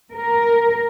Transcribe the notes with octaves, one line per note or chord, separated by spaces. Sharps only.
A#4